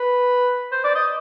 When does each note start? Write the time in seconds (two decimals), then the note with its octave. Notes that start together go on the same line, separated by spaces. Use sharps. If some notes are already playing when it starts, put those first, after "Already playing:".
Already playing: B4
0.72 C5
0.84 D5
0.95 D#5